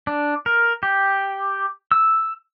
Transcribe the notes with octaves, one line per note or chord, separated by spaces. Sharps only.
D4
A#4
G4
E6